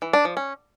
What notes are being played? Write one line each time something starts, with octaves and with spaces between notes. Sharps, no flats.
E3
D4
F3
C#4